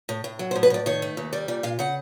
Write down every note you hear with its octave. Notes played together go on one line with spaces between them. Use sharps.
A2
A2
F#3
C5
A2
B4
A2 D5
D#3 C#5
A3
D#2
G3 D5
A#2 D5
A#2 F5
C#3 F#5